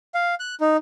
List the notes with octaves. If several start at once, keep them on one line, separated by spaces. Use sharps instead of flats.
F5
F#6
D#4